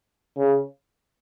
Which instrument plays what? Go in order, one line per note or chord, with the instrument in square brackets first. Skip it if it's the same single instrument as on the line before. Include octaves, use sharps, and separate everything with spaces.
[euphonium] C#3